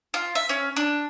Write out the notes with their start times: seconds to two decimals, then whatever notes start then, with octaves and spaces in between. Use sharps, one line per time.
0.14 F4
0.35 E5
0.49 C#4
0.76 D4